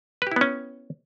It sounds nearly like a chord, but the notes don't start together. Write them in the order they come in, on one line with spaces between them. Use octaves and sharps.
B4 G4 E4 B3 C#4